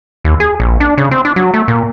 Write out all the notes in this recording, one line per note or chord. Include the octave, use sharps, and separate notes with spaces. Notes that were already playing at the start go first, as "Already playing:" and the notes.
D#2
G#4
A#1
D4
C#3
C4
D4
F#3
A3
A#2